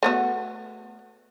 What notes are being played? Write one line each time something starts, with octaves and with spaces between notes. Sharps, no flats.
A3 B3 F#4